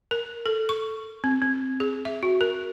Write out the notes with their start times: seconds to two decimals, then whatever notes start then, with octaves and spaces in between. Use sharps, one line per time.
0.11 A#4
0.46 A4
0.69 C#6
1.24 C4
1.42 C4
1.80 G#4
2.05 E5
2.23 F#4
2.41 A#4